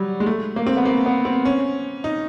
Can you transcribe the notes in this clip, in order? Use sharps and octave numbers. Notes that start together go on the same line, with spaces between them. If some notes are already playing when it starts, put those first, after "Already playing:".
Already playing: F#3 G3
G#3
A3
A#3
C4
B3
A#3
B3
C4
C#4
D#4